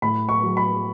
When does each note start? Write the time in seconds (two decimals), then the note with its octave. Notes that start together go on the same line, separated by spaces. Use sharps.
0.02 A2 B5
0.29 C#6
0.43 F#3
0.57 B5